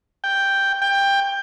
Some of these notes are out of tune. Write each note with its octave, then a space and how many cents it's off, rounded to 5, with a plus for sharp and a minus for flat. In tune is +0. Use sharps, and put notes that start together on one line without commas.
G5 +0
G5 +15